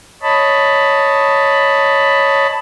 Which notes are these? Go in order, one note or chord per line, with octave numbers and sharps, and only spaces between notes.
C#5 D#5 A5 B5